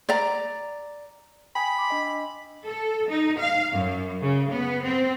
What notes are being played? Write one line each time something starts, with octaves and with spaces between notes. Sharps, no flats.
D5 A#5
G5 G#5 B5 D#6
C6 D6
D4 D#5
A4
D#4
F5
F#2
C#3
B3
C4